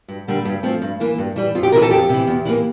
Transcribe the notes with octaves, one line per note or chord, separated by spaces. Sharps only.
G2
D3 G3 A#3
G2
F3 A3 C4
G2
E3 A#3
G2
E3 G3
F2 F4
G4
C3 E3 A#4
A4
F2 G4
C3 E3
E2
E3 G3 A#3